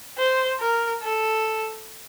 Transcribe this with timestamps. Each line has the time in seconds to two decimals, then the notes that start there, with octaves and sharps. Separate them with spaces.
0.18 C5
0.60 A#4
1.02 A4